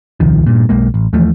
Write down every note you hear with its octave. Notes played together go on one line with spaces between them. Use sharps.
D#1 C2 D#3 F3
G2 A#2
B1 G#3 A#3
A1
D#2 E3 F3 A3